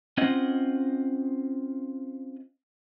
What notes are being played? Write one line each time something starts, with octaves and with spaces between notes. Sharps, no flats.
C4 C#4 F4 C5 D#5 F#5